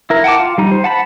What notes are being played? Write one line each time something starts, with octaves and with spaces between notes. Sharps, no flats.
E4 A#4
F#5 G5 A5 D6
F4
G3 D#4
C5
F#5 A5 B5